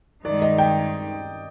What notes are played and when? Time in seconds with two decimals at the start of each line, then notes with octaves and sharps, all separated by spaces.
0.25 G2 D#3 G#3 D#4 D5
0.42 D#5
0.58 G5